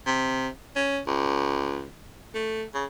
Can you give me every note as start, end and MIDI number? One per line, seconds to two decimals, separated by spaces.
0.06 0.48 48
0.76 0.99 61
1.07 1.88 37
2.34 2.64 57
2.74 2.85 49